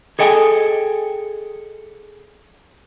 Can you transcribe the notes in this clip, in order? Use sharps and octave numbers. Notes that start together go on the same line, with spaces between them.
G#4 A4 D#5 G5 G#5